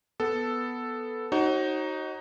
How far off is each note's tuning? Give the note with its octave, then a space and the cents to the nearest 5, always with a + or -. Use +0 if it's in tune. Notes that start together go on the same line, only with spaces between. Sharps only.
B3 +0 A4 +0
D#4 +0 F#4 +25 C#5 -45